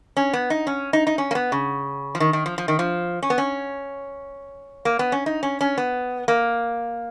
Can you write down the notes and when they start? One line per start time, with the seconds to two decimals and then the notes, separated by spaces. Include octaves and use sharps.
0.17 C#4
0.33 B3
0.50 D#4
0.67 C#4
0.93 D#4
1.07 D#4
1.18 C#4
1.31 A#3
1.35 B3
1.52 C#3
2.15 F3
2.20 D#3
2.33 D#3
2.46 F3
2.58 F3
2.68 D#3
2.79 F3
3.23 C#4
3.30 B3
3.38 C#4
4.85 A#3
4.99 B3
5.12 C#4
5.26 D#4
5.43 C#4
5.61 C#4
5.78 B3
6.28 A#3